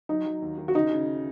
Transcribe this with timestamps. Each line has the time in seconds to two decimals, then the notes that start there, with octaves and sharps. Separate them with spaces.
0.09 F#3 D#4
0.25 F#3
0.42 D#2
0.58 D#3
0.68 F#4
0.75 C#3 D#4
0.91 C#3